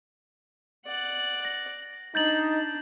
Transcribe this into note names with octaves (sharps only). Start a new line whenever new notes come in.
D5 F#5
A#6
D4 D#4 G6 A6 F#7